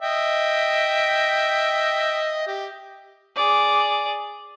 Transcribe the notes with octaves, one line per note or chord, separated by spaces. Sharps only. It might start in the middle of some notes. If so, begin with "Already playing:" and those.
D#5 E5 G5
G4
G#4 D5